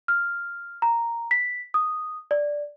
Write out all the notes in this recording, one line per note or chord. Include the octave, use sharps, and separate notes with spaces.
F6
A#5
B6
D#6
D5